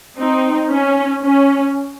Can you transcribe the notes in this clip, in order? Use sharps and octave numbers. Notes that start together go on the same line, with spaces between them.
C4 D#4
C#4
C#4